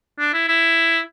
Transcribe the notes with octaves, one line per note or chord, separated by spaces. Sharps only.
D4
E4
E4